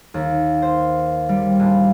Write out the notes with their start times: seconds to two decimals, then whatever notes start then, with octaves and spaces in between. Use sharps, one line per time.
0.14 D#2
0.62 C5
1.29 G3
1.59 A#1